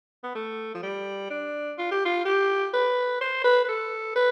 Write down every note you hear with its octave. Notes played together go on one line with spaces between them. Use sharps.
B3
A3
F3
G3
D4
F4
G4
F4
G4
B4
C5
B4
B4
A4
B4